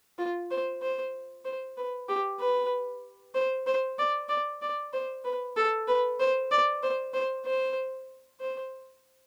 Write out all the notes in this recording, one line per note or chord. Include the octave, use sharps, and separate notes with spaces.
F4
C5
C5
C5
B4
G4
B4
C5
C5
D5
D5
D5
C5
B4
A4
B4
C5
D5
C5
C5
C5
C5